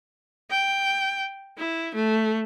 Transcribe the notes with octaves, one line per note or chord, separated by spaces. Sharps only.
G5
E4
A3